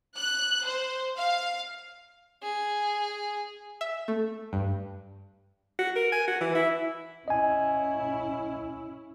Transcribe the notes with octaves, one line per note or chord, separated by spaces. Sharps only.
F#6
C5
F5
G#4
E5
A3
G2
F#4
A#4
G#5
F#4
E3
E4
C#4 E4 D#5 G#5